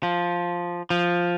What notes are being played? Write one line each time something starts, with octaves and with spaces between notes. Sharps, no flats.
F3
F3